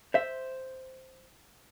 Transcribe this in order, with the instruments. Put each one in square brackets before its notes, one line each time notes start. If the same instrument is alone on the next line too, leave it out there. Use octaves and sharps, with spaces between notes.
[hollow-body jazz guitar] C5 E5